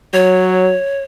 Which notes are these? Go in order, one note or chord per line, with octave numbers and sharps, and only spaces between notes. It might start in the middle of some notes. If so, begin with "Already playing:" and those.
F#3 C#5